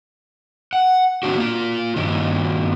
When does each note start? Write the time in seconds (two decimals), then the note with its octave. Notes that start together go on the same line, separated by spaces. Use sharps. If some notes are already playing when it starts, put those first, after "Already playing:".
0.73 F#5
1.23 A2 D#3 A3 C4 D4 F#4
1.37 A#3 F4
1.96 G2 A#2 D#3